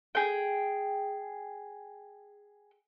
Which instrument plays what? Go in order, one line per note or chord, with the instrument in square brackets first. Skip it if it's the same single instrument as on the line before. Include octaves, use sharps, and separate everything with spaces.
[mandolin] G#4 G5